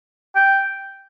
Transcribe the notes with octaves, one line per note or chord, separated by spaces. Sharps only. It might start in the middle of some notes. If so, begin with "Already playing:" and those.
G5